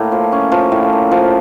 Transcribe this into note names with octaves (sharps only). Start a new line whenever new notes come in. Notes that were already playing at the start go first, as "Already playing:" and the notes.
Already playing: A2 A#3
F3
C#4
F3
A2
A#3
F3